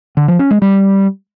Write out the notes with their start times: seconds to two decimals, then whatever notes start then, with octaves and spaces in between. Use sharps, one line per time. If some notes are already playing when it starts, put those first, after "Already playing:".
0.17 D3
0.28 F3
0.39 C#4
0.51 G#3
0.62 G3